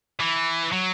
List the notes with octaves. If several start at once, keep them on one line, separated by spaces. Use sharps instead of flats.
E3
F#3